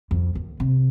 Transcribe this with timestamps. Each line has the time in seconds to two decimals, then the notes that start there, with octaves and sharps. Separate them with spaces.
0.11 F2
0.35 D#2
0.60 C3